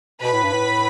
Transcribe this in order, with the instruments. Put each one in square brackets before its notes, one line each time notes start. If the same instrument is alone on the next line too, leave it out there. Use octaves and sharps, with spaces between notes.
[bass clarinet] B2 [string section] B4 B5
[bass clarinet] A2
G2
A2